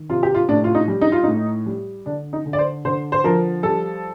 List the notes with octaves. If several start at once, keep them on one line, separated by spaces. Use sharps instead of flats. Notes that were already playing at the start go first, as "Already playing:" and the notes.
Already playing: D#3
C3 F4
G4
F4
A2 D4
F4
D#4
G3
D#4
F4
A2 D#4
G3
D3 D4
D#4
D3
D5
C5
D3 C5
C5
F3 A#4
G3 A4